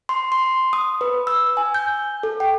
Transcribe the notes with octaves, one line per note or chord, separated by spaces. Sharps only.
C6
C6
D#6
B4
E6
G#5
G6
A4
G5